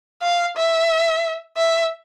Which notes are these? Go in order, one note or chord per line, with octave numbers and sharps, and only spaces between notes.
F5
E5
E5